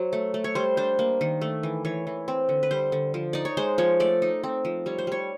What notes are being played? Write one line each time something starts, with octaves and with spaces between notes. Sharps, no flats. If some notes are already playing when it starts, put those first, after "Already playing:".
Already playing: F#3 C5
A3
A3
C#5
G3 C5
D4 C5
A#3
D#3
A3
E3
E3 C#5
E3
C4
D3
B4
G3 C5
D3
F3
D#4 D5
C#5
G#3 C5
F3 C#5
A3 D5
D#4
C4
F3
G3 C#5
C5
G3 C#5